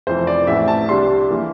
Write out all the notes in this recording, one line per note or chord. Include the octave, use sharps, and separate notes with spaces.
F1 F2 E3 C5
D5
A1 A2 E3 E5
A5
C2 C3 G3 D4 C6
E3 A#3